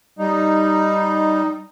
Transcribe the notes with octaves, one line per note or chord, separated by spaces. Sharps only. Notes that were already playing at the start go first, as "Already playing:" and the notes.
G3 D#4